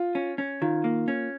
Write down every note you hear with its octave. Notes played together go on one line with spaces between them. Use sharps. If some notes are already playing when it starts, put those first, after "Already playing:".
Already playing: F4
C#4
C#4
D#3 F4
A#3
C#4